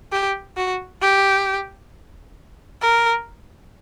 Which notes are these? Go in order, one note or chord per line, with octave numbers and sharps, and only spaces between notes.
G4
F#4
G4
A#4